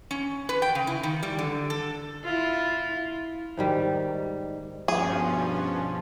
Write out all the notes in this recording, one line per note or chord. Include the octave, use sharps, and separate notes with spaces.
C#4
B4
G5
C#3
E4
D#3
G3
D3
A4
E4 F4
G#2 D#3 G3
G2 B2 F3 C#4 G#4